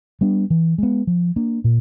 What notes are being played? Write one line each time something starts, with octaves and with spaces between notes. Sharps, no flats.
G3 B3 D4
E3
G#3 B3
F3
A#3 D4
A#2